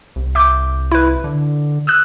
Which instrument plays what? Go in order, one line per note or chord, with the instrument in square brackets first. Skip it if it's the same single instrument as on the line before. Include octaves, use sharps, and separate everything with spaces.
[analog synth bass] C2
[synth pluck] E5 D6 G6
E4 B4
[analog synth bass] D3
[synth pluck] D#6 E6 F#6